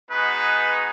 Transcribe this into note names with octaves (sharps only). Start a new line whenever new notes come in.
G#3 B3 D#4 F#4 B4